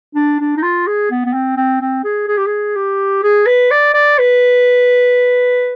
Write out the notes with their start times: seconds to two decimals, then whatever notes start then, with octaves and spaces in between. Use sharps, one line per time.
0.15 D4
0.40 D4
0.57 D#4
0.63 F4
0.87 G#4
1.11 B3
1.26 B3
1.33 C4
1.57 C4
1.81 C4
2.04 G#4
2.28 G#4
2.37 G4
2.47 G#4
2.76 G4
3.23 G#4
3.46 B4
3.71 D5
3.94 D5
4.18 B4